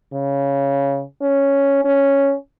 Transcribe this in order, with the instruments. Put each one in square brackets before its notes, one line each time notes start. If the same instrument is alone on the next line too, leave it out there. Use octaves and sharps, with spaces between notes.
[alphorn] C#3
C#4
C#4